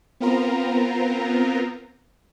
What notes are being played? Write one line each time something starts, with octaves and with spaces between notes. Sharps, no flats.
B3 C4 F4 A#4 A#5